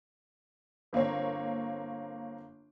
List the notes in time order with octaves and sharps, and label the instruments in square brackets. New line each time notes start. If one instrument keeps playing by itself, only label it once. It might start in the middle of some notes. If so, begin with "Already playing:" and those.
[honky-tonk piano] G1 A#3 C4 C#5